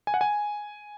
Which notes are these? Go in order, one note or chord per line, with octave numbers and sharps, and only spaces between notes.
G#5
F#5
G#5